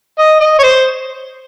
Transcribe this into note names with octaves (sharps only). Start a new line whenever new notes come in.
D#5
D#5
C#5
C5